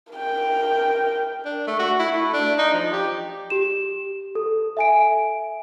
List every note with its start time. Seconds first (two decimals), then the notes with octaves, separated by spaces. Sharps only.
0.13 A#4 G5
1.45 D4
1.67 A3
1.79 F#4
1.99 E4
2.12 A3
2.33 D4
2.59 D#4
2.74 F3
2.92 G4
3.50 G4 E7
4.35 A4
4.77 E5 G#5 D7